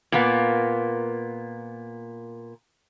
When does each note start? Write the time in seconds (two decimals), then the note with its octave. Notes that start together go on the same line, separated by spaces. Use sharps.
0.12 A#2 A#3 B3